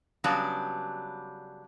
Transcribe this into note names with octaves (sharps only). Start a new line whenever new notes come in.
C#3 F#3 G3 B3 D4